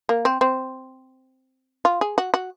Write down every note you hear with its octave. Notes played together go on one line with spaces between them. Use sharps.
A#3
C4
C4
F4
G#4
F#4
F#4